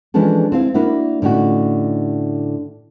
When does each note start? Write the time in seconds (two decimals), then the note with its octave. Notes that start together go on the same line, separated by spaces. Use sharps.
0.14 E3 F3 G#3 C#4 D4 A4
0.52 C4 E4 F5
0.74 A#3 D4 E4 F#4
1.22 A2 D3 C#4 D#4 F#4